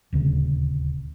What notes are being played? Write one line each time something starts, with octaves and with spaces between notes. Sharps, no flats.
D#1 D2 C#3